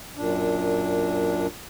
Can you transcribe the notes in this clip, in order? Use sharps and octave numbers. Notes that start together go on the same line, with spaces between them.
F#2 A#2 D4